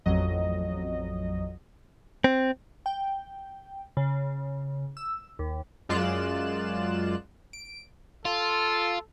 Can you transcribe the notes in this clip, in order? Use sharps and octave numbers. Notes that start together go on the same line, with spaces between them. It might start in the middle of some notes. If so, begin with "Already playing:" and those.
A1 F2 F#3 D#5
C4
G5
C#3
E6
D#2
F#2 G#3 F4 D5 F#6 E7
D7
F4 A4